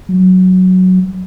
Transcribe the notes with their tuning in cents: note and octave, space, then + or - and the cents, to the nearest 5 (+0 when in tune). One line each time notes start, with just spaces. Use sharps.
F#3 +0